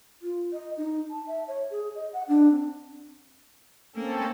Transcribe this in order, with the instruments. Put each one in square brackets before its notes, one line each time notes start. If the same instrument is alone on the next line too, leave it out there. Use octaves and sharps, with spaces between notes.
[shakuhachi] F4
D#5
D#4
A5
E5
C#5
G#4
D#5
F#5
D4
C4
[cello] A#3 [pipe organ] C4 C#4 A4